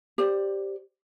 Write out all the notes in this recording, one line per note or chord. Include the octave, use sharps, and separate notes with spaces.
G4 C5 D5